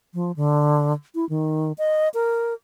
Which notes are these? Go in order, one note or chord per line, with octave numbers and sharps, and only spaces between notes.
F3
D3
E4
D#3
D#5
A#4